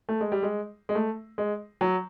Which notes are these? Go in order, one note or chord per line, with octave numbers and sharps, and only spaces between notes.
A3
G#3
G3
G#3
G#3
A3
G#3
F#3